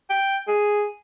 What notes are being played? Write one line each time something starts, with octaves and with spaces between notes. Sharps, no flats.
G5
G#4